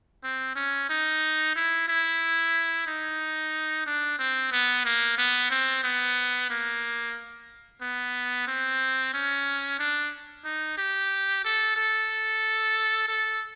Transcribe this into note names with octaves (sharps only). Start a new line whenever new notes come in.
C4
C#4
D#4
E4
E4
D#4
D4
C4
B3
A#3
B3
C4
B3
A#3
B3
C4
C#4
D4
D#4
G4
A4
A4
A4